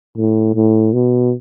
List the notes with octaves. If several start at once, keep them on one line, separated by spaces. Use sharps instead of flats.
A2
A2
B2